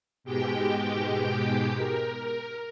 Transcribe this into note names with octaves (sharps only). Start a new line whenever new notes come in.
G#2 B2 G#3 G4 G5
A#4